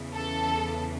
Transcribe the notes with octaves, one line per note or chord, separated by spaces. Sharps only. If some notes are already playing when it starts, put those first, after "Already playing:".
Already playing: E2 C#3 E3
A4